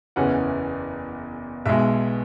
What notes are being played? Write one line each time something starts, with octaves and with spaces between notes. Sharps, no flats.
F#1 E2 E3 C#4 F#5
B1 B2 G#3 E5